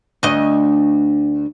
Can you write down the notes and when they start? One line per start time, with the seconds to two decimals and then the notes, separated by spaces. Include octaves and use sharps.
0.23 D2 D#5